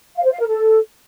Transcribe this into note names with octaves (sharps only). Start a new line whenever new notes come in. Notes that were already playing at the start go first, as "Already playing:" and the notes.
F5
C5
F5
A#4
A4